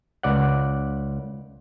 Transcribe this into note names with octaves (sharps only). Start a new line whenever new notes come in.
C#2 D5 F#5